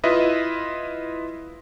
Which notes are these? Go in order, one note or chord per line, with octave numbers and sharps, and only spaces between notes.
E4 F4 B4 D#5 E5